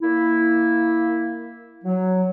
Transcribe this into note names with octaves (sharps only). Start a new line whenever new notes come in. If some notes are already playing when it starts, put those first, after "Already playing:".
A#3 E4
F#3